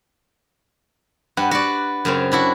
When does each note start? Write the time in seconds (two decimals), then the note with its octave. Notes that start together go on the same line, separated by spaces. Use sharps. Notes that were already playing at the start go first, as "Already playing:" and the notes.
1.37 G2 B4 F#5 G5
1.51 F#4 B4 D5
2.05 F#2 C#3 C4
2.32 D4 E4 F#4